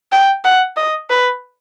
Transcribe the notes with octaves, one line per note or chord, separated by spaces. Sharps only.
G5
F#5
D#5
B4